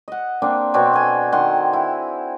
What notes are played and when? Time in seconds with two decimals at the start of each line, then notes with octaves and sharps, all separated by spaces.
0.08 D#5 F#5
0.42 A#3 C4 D4
0.74 B2 C4 D4 C#5
0.93 A4 G#5
1.32 D#3 F#5 C6
1.73 E4